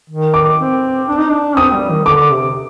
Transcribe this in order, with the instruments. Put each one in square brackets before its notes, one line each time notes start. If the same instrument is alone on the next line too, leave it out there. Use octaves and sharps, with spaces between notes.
[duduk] D#3
[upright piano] D6
[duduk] C4
D4
D#4
D4
[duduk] C4 [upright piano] D#6
[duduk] G3
D#3
[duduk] D3 [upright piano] D6
[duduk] C3